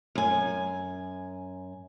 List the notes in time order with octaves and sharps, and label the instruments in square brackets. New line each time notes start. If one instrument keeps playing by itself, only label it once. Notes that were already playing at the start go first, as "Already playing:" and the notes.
[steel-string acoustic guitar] F#2 G#5